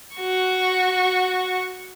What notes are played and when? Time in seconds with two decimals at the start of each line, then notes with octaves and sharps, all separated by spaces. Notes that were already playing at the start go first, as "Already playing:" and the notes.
0.17 F#4 C#6